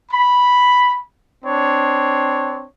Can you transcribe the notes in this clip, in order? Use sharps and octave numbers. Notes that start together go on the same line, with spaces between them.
B5
C4 D4 C#5